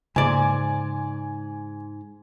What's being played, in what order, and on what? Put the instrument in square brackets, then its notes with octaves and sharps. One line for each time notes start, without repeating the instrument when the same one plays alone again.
[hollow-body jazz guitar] G#2 D5 [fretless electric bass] C#3 A#3 [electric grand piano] G#5